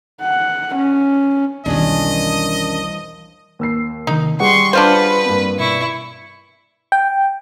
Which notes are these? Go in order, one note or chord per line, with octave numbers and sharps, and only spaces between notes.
F#5
C#4
B1 E2 D#3 E3 G3 C#4 D4 D#5
D#2 E6 C7
C3 D#3 D#4
G3 G#4 F#5 C6 C#6
D4 F4 B4 C5
G2 A#3 C4
B2 E4 C#6
G5